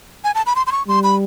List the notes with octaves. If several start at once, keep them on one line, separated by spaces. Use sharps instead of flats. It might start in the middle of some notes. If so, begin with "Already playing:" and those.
G#5
A5
B5
C6
C6
C#6
G3 C6
B5